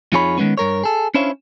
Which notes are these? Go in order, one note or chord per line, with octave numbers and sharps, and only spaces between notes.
F2 D#4 F4 G#4 C#5 B5
D#3 G#3 A3 B3 C#4
G2 A#4 C#5
G#4 A4
C#4 D4 E4 C5 C#5 F5